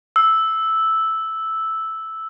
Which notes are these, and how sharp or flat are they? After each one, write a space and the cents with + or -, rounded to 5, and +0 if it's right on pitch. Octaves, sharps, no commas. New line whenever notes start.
E6 -5